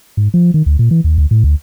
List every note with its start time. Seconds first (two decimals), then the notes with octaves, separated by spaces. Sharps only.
0.17 G#2
0.34 F3
0.54 D#3
0.66 D2
0.79 A#2
0.91 E3
1.04 D#2
1.18 D2
1.31 A2
1.44 D2